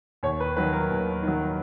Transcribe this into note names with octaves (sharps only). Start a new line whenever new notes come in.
D#2 C#5
B4
D#3 F#3 B4
A#4
D#2
D#3 F#3